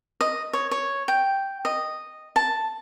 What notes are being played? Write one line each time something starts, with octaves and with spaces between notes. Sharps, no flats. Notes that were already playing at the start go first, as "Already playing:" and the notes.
D#5
C#5
C#5
G5
D#5
A5